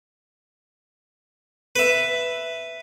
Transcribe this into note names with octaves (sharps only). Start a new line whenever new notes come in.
B4 E5